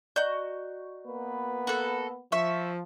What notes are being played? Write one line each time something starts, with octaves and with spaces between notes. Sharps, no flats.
F#4 D5 D#5 A#5 G6
A#3 B3 B4
F#4 A4
F3 E5 C#6